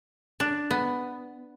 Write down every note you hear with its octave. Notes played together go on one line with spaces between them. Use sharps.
D4
B3